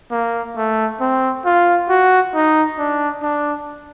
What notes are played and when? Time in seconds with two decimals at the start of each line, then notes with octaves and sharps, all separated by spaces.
0.11 A#3
0.57 A3
1.00 C4
1.45 F4
1.89 F#4
2.35 D#4
2.78 D4
3.22 D4